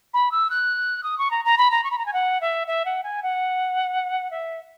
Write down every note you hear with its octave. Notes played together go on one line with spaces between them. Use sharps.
B5
E6
F#6
D#6
C#6
A#5
A#5
B5
A#5
C#6
B5
A#5
G#5
F#5
E5
E5
F#5
G#5
F#5
E5